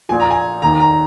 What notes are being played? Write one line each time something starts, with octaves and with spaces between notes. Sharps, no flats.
A#1 A#2 F3 G#5
A#5
G#5
D#2 D#3 A#5
A#5